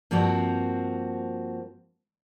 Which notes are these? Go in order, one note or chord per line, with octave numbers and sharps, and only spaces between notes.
G2 F3 A#3 C4 F#4